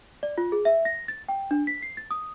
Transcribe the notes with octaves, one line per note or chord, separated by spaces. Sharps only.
D5
F4
G#4
E5
A#6
A6
G5
D4
B6
C7
A6
D#6